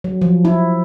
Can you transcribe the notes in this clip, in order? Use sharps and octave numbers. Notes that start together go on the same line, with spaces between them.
F#3
F3
E4